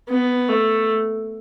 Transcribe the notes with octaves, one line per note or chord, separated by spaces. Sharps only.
B3
A3